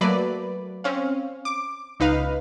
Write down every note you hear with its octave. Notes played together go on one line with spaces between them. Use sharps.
F#3 A3 A#3 B4 D5
C4 C#4 F5
D6
C#2 D#4 B4 F5